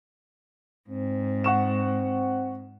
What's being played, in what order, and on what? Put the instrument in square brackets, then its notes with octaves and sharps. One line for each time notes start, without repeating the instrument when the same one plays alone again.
[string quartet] G#2 [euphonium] C4
[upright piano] F#5 C#6 E7